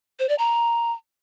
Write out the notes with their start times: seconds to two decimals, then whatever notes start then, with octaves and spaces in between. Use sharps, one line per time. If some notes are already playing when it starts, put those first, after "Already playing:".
0.19 C5
0.29 D5
0.39 A#5